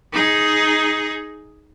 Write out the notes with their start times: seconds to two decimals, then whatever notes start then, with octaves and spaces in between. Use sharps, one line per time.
0.13 D#4 G#4